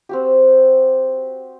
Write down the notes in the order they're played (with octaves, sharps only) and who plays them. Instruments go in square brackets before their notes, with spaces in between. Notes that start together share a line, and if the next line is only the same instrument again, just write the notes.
[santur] C4 F#4 G4